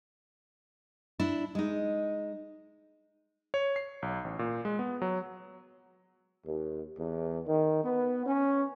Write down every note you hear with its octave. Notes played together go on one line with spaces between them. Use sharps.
D4 E4
G#3 D#4
C#5
C7
B1
A1
A#2
G#3
B3
F#3
D#2
E2
D#3
B3
C#4